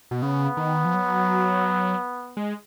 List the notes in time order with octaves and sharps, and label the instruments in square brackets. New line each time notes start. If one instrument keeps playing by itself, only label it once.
[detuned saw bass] B2
[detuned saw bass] C#3 [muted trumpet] B3
[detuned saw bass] D#3
F3
F#3
G#3